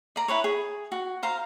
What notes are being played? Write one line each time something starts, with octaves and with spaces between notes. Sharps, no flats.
D5 A#5
E4 G4 B4 C#5
G#4
F#4
C5 F5 A#5